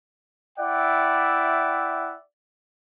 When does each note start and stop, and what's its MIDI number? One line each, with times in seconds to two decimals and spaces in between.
0.59 2.15 64
0.59 2.15 74
0.59 2.15 76
0.59 2.15 78
0.59 2.15 79